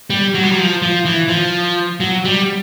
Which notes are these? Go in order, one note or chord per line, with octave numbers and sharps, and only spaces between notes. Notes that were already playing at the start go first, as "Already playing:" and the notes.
G3
F#3
G3
F#3
F3
F3
E3
F3
F#3
G3